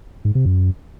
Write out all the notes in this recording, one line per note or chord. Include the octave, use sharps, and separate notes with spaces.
G#2
C3
F#2